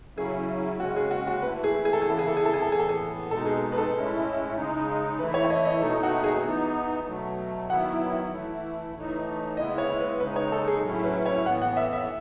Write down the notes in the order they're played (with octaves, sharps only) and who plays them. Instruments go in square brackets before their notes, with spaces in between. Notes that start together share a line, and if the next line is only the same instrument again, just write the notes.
[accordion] C#3 F#3 C#4 E4 [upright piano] G#4
[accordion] C#3 G#3 C#4 [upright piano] F#4
[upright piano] G#4
F#4
F#4
[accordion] E3 A3 E4 [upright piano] B4
[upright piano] G#4
G#4
A4
G#4
[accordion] C#3 E3 B3 E4 [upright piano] A4
[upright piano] G#4
A4
G#4
A4
G#4
A4
[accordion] A2 E3 B3 [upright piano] G#4
[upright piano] A4
G#4
[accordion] B2 G#3 D#4 [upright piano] A4
[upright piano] G#4
B4
A4
[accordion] A2 G#3 C#4 E4
C#3 G#3 D#4
[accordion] E3 A3 E4 [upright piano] B4
[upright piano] C#5
C#5
D#5
D#5
[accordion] B2 A3 D#4 [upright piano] A4
[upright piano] F#4
G#4
[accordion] E3 B3 D#4
B2 F#3 A3
[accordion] D#3 F#3 B3 E4 [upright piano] F#5
[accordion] E3 A3 E4
A2 E3 A3 D#4
[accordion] C#3 G#3 B3 E4 [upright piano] D#5
[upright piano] C#5
B4
[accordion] C#3 G#3 D#4 [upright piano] B4
[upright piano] C#5
A4
G#4
[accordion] A2 F#3 C#4 E4
[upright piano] B4
C#5
[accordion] A2 E3 B3 [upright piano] F#5
[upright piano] F#5
E5
E5